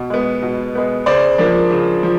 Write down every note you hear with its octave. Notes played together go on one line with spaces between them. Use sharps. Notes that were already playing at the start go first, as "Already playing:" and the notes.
Already playing: B2
G#3 B3
B2
G#3 B3
C#3 C5 D5
F3 A#3 D4
C#3
F3